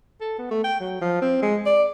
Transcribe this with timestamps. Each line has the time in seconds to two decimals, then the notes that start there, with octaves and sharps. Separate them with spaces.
0.21 A4
0.39 B3
0.51 A3
0.64 G5
0.80 F#3
1.01 F3
1.22 C4
1.42 G#3
1.66 D5